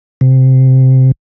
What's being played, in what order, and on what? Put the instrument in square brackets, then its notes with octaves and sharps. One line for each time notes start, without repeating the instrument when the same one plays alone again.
[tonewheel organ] C3